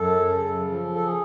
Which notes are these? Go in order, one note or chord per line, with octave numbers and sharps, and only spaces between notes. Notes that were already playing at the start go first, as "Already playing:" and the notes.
Already playing: F#2 A4
C#3
F3
A4
G#4